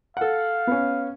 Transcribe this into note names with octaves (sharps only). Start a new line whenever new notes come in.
A4 F5 F#5
B3 C#4